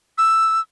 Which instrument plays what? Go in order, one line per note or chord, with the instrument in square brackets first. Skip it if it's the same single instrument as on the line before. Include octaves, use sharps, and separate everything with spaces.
[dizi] E6